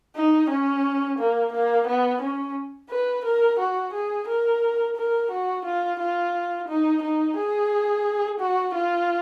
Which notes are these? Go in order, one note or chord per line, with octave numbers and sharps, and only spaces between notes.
D#4
C#4
A#3
A#3
B3
C#4
B4
A#4
F#4
G#4
A#4
A#4
F#4
F4
F4
D#4
D#4
G#4
F#4
F4